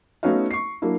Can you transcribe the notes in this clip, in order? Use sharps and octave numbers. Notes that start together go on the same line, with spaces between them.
A3 B3 C#4 D#4 F#4 F5
C#6 C7
F#3 A#3 D4 E4